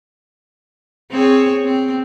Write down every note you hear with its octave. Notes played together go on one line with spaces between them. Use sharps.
C4 G#4 C#5
C4